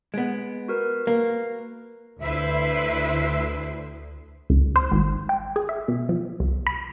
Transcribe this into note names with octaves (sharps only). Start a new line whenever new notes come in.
G#3 B3 D7
F#4 A#4 B4
A#3
D2 E4 B4 C5 E5
C#2
C5
G#1
G5
G#4
E5
B2
F3
C2
B5